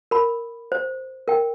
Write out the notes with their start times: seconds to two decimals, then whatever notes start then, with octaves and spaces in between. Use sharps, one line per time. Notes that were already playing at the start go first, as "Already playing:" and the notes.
0.11 A#4 B5
0.72 C5
1.28 A#4 G5